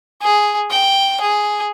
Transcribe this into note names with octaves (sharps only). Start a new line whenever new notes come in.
G#4
G5
G#4